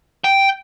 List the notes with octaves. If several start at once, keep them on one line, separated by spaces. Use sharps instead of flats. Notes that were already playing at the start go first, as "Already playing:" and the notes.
G5